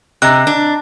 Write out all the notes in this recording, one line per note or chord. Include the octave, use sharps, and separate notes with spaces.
C3 D#5 A#5 F#6
D4